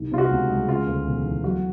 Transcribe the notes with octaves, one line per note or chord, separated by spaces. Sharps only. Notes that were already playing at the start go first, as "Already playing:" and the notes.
Already playing: C2 D#3
C3 F4
F#4
C#2
G#3
C#3 F4
D2
E1
E3
F#3 F#4